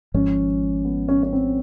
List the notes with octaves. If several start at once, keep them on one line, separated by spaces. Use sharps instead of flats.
G#1 G#2 F3 C#4
B3
C#4
C#4
C4